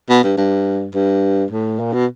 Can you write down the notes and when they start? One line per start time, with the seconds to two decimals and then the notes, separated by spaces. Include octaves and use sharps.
0.10 B2
0.24 G2
0.37 G2
0.94 G2
1.51 A2
1.79 A#2
1.93 B2